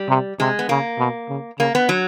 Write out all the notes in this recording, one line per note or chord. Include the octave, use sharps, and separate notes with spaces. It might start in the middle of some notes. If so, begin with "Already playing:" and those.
Already playing: G3
C3
C3 G#3
B3
C#3 A#3
B2
C#3
C#3 A#3
B3
F#3